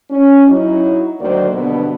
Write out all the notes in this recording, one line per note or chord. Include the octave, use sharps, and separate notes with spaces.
C#4
F#3 D#4 E4
D2 D#3 F#3 A#3 C5 D5
G2 B2 D3 B3